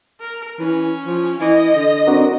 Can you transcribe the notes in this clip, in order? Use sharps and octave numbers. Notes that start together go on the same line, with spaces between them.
A#4
E3 C#4
F3
E3 D#5
D3
C4 D4 F#4 A#4